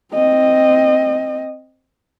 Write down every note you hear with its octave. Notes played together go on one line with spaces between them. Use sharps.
C4 D#5